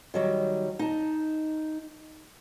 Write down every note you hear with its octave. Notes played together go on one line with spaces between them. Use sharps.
D#3 F#3 G3
D#4 A5